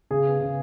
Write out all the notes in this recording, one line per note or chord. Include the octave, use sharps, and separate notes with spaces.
C#3 G#4
B3
C#3